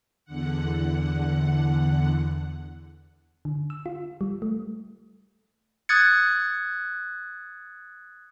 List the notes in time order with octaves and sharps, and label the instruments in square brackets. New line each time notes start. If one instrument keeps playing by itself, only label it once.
[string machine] E2 D3 F#5
[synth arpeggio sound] D3
E6
F4
G3
A3
[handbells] D#6 F#6 G#6 A6 C#7